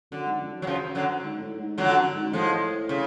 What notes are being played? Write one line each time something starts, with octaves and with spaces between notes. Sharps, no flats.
F#2 D3
G#2
F2
F#2
F#3
C#3 F3
D3 F#3
G#2
A2
G#2
F2 D3 F#3
F#2
G#2
A2 F3 G#3
C#3